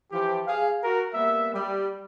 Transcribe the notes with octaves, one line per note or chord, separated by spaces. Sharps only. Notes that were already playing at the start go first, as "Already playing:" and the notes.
E3 F3 G4
G#4 F5
F#4 A#4
G3 A#3 B3 E5
G3